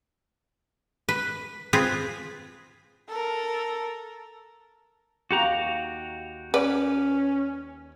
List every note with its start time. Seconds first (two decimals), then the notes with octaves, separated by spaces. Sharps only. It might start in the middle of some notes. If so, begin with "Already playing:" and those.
1.09 B4
1.73 C4 F4 G#4 B4
3.08 A4 A#4
5.31 D#2 A#3 F#4 G4 F5 A#5
6.54 C#4 B4 D5